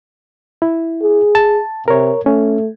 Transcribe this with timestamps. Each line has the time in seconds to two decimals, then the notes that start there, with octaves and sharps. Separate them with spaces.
0.62 E4
1.02 G#4
1.35 A5
1.88 C3 A#4 C#5
2.26 A3 C#4